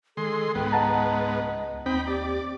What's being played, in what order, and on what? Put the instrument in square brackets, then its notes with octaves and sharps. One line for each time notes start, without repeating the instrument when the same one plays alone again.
[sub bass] D#3 [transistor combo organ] G#3 C6 [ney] A4
[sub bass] C#2 [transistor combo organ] G#2 B3 [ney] G5
[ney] D#5 [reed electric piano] F#5 A5 A#5
[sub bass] D#2 [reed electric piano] C4 [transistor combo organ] D#4 G5 B5
[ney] G4 [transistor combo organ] D5